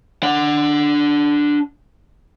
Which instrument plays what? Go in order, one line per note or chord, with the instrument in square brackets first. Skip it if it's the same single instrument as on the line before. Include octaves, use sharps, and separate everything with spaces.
[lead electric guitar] D4 F#5